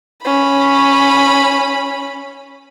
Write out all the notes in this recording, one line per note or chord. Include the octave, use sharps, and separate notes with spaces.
C#4 B5